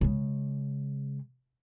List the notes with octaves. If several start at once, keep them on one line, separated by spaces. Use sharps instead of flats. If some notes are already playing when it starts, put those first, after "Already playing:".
C#3 G#3